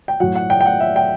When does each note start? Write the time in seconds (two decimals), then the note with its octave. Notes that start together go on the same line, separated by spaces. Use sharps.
0.08 G5
0.20 A2 F#3 F#5
0.35 F#5
0.50 G5
0.61 G5
0.66 F#5
0.80 E5
0.96 G5